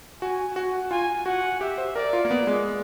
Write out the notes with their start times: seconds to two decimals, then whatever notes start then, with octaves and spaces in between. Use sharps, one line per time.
0.21 F#4 G#5
0.56 F#4 F#5
0.91 F4 G#5
1.26 F#4 F#5
1.61 G4 E5
1.78 C5
1.96 A#4 D5
2.13 F4
2.25 A#3
2.31 B3
2.47 G#3